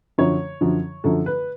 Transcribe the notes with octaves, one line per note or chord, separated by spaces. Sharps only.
F#2 D3 F3 C#5
F#2 D3 F3
F#2 D3 F3 A4
B4